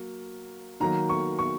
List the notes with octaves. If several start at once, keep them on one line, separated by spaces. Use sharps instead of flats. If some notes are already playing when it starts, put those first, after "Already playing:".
Already playing: F#3 A#3
D#3 F#3 A#3 A#5
C#6
C#6